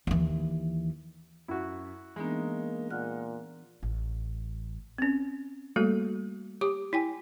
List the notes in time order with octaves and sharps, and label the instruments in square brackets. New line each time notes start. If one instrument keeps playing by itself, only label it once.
[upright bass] D#2 E3
[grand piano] F#2 [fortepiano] E4 F#4
[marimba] E3 B3 D4 [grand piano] G#3 D#4 [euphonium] A#3
[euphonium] A#2 [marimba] F#5 F6 F#6
[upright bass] A1
[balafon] C4 C#4
G3 A3 A#3 F#4 A4
G4 D6
E4 G5 G#5